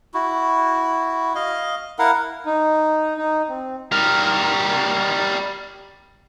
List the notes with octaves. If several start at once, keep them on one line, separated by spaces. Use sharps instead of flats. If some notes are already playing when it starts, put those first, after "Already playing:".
E4 F#4
D#5 F5
E4 A#4 F5 F#5
D#4
D#4
C4
G3 A#4